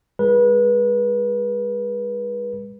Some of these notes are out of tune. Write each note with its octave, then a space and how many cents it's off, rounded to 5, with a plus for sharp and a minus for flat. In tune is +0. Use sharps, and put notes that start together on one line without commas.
G#3 -40 G#4 +0 B4 -30